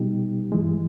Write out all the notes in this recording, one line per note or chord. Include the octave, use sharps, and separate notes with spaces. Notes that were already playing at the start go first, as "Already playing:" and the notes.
Already playing: B2 G3 B3 D#4 G4
G2 E3 G#3